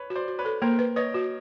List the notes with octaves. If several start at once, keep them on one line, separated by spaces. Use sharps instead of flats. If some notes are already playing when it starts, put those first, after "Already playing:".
Already playing: B4 C#5
F#4
C5 D5
F#4
B4 C#5
A4
A#3 A#4 C5
B4
B4 C#5 D#5
F#4